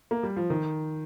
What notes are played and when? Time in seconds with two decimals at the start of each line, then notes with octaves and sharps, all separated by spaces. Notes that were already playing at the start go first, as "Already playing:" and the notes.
0.11 A#3
0.23 G3
0.36 F3
0.50 D#3